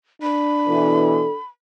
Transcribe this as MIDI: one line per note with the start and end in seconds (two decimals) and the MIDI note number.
0.22 1.37 62
0.22 1.45 83
0.68 1.24 47
0.68 1.24 52
0.68 1.37 69